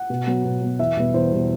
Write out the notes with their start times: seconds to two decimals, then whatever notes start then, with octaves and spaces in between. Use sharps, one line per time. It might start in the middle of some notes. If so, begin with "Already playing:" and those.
Already playing: F#5
0.10 B2
0.27 F#3 B3
0.44 B2
0.62 F#3 B3
0.79 E2 E5
0.97 B2 G3 B3
1.14 E2 C5
1.32 B2 G3 B3